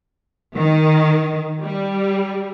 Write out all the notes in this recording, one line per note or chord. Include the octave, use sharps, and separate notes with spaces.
D#3
G3